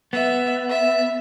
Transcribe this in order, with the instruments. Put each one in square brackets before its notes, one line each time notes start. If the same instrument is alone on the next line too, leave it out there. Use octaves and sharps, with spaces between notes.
[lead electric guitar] B3 [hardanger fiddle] E5
[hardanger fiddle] E5